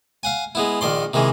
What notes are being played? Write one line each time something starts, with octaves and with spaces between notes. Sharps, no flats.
F5 F#5 G#5
G#3 B3 E4
A#1 D#3 D5 C6
C3 D#3 E3 G#3